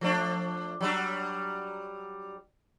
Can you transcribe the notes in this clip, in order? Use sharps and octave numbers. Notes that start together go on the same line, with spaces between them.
F3 A3 D4
F#3 G3 D4